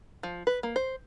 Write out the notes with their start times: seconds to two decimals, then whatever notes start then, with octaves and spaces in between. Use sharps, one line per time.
0.23 F3
0.47 B4
0.63 A#3
0.76 C5